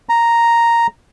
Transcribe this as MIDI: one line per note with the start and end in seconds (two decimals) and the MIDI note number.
0.09 0.87 82